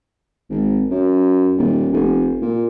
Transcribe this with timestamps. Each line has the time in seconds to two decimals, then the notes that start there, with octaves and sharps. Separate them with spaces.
0.50 G#1
0.91 F#2
1.58 D#1
1.93 F1
2.42 A#2